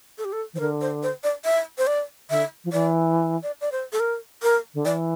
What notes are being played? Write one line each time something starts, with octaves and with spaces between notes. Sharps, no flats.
A4
G4
A4
E3 C5
D3 A#4
C5
C5
D5
E5
C5
D5
D3 E5
F3
E3 D5
D5
D5
C5
A4
A#4
A#4
D3
E3 D5